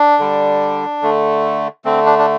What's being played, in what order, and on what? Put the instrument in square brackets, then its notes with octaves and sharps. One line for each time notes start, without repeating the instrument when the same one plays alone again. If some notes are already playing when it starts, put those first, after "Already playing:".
Already playing: [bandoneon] D4
D3 G3
D3 A3
D3 A3 C4
D4
D4